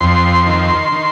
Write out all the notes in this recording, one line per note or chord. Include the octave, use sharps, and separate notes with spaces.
F2 C6
D#3
D#3